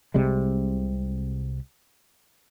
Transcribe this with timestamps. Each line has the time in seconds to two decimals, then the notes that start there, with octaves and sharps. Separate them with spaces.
0.14 C2 C3 G3 G#3